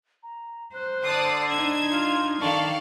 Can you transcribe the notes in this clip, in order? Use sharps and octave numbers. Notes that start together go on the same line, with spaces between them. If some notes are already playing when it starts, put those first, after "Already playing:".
A#5
C5 F#6
D3 D5 A5 D#6 C7
D4 D#4 G#6 E7
F4 F5 C6
D#3 A4 D5 F5 A5 C#6